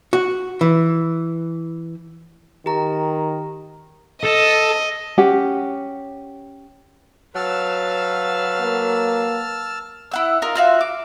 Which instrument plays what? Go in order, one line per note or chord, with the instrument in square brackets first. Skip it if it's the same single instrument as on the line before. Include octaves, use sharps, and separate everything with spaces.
[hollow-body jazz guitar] F#4
E3
[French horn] D#3 [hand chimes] G4 A#5
[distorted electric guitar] A4 [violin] D#5
[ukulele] C#4 G4 F#5
[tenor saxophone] F#3 [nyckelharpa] B4 F5 [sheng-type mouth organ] A5 E6 F6
[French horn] A#3
[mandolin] E4 F#5 E6
D#4 F4 A#4
F4 F#4 E5
D6